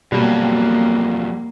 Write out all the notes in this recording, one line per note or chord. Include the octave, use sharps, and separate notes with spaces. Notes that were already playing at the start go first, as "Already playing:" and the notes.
F2 B2 F#3 G3 A#3